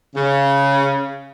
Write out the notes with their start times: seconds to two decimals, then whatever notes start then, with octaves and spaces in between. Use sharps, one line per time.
0.16 C#3